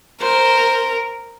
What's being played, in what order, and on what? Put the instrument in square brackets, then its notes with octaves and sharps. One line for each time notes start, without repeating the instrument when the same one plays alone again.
[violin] A#4 [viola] C5